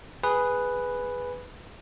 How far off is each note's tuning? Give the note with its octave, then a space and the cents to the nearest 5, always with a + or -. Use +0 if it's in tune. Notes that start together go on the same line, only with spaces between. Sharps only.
G#4 +0 B4 +0